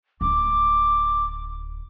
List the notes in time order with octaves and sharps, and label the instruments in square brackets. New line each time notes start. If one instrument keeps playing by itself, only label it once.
[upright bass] D1 E4 [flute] D6